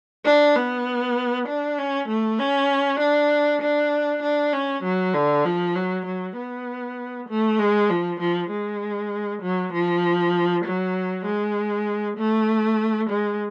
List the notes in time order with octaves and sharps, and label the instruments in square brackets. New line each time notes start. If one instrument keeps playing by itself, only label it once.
[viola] D4
B3
D4
C#4
A3
C#4
D4
D4
D4
C#4
F#3
D3
F3
F#3
F#3
B3
A3
G#3
F3
F3
G#3
F#3
F3
F#3
G#3
A3
G#3